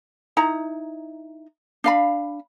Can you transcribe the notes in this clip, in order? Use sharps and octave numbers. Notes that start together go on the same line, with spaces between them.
D#4 E4 A#5
D4 F5 B5